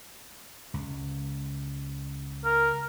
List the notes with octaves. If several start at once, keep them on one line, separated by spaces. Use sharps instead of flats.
C#2
A#4